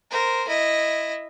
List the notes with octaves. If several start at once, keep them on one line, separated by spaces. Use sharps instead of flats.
A#4 C5
E4 D#5